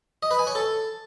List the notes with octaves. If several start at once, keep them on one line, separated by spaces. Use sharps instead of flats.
D#5
B4
G#5
C#5
A4